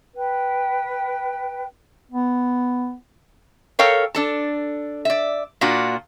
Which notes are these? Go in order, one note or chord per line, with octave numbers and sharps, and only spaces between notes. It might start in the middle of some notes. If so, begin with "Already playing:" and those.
B4 G5
B3
A4 A#4 C#5 F5 G5
D4 A4 A5
D5 E5
A#2 A#3 D4 F4 F#4